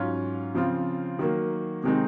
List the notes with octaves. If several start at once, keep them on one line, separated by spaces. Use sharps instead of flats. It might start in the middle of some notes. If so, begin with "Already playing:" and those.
Already playing: G#2 F#3 C#4 F4
C#3 F3 C4 F4
D#3 F#3 A#3
C3 D#3 G#3 C4 D#4